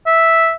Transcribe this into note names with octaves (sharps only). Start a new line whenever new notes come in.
E5